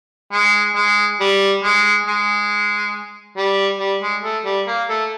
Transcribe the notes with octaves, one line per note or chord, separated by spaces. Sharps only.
G#3
G#3
G3
G#3
G#3
G3
G3
G#3
A3
G3
A#3
A3